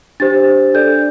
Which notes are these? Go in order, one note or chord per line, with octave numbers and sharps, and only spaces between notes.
D4 G4 C5 A6
D4 A4 D5 G6